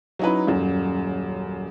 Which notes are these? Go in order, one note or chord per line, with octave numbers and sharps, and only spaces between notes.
F#3 C#4 D#4 E4 B4
D#1 F#2